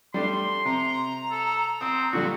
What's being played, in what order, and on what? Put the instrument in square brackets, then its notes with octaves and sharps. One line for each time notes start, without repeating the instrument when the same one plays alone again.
[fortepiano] G3 A3 D4 [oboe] C6
[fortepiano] C3 [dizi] A#5
[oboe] A4
[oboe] C4 [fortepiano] D#6
[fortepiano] A#2 D3 G3 [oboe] F#4